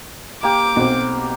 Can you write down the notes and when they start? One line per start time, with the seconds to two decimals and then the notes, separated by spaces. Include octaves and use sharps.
0.43 A#3 G4 D6
0.76 B1 C4